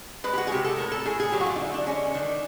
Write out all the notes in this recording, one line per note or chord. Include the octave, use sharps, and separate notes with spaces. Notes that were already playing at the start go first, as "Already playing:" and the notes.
G#3 B4
G4
F#4
G#4
C3 G4
A4
A2 A#4
A4
A2 G#4
G#4
F#3 G4
F#4
F4
D#4
D3 E4
D4
G#3 C#4
C#4
D#3 D4